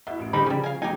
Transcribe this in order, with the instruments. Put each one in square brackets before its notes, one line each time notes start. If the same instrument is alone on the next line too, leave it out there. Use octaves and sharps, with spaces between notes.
[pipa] B2 [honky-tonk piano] E4 E5
[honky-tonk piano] A1 D7
[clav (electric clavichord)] D3 G3 D#4 [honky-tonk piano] G4 C5 [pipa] B5
[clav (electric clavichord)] C#3 [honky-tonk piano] F3 [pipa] G3 C#4
[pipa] F5 G#5
[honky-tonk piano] F#2 C#3 F#3 [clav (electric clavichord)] D#4 [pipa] G4 G#5